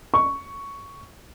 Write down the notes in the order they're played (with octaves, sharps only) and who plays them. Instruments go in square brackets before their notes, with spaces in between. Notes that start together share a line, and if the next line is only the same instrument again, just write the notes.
[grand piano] C#6